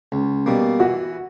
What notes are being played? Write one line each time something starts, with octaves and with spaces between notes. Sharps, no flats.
C#2
B2 G3 A#3
E3 F#4